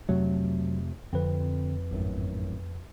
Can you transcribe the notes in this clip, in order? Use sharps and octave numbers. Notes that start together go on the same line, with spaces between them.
F2 C3 F#3 A3
F2 D3 C4 B4
G#1 F#2 A2